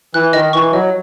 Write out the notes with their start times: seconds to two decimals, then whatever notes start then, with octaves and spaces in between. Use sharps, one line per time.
0.14 E3 F#6
0.33 D#3 D#5
0.53 E3 C#6
0.72 F#3 D#5